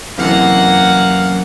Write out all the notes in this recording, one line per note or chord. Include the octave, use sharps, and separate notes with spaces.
F#2 C3 E3 A#3 F5 F#5